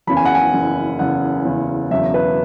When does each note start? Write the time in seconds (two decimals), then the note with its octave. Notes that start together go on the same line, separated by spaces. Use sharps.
0.07 F#1 E2 C#3 B5
0.17 G#5
0.25 F#5
0.35 G#5
0.53 F#1 E2 C#3
0.99 F#1 E2 C#3 F#5
1.45 F#1 E2 C#3
1.90 E1 E2 C#3 F#3 E5
2.14 B4